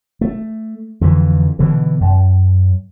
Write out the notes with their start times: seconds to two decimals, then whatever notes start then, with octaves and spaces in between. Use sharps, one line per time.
0.21 A3
1.01 F2 D3 E3
1.59 B2 D3 E3
2.01 F#2